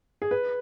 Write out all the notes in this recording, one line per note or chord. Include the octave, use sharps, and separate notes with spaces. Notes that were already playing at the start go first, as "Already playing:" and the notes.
G#4
B4